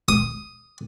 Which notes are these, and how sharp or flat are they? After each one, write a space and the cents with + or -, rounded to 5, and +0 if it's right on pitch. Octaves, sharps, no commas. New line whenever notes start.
D#6 +5